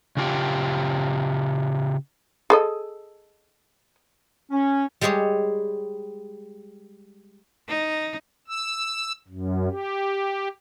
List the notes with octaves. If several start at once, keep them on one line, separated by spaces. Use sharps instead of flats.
C#3 F4 G4
G#4 A4 D#5
C#4
G3 G#3 G4 G#4 C#5
D#4
E6
F#2
G4